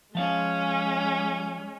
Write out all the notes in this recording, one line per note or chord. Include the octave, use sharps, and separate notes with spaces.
F3 G#3 C#4 F5